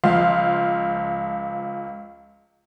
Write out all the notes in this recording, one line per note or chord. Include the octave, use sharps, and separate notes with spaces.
C#2 F3 F5 C6